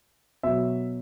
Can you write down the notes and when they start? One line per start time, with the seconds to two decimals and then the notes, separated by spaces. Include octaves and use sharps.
0.43 B2 F#3 E5